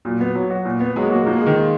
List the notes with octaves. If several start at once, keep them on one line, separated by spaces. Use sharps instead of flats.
A#2 F#3
B3
F#3
F#4
A#2
B3
F#3 G#3
A#3
G#3 F#4
F3 A#3
G#3
D#3 G#4
F4